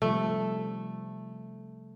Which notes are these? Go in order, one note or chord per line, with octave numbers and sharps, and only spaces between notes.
C3 F3 G3 A3